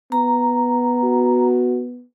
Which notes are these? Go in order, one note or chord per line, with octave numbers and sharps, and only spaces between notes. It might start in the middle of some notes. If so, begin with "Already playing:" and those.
B3 A#5
F#4